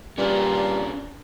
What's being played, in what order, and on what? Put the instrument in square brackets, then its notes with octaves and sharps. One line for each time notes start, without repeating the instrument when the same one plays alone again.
[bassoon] G2 [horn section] A#2 [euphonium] G3 [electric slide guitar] C#4 D4 G#4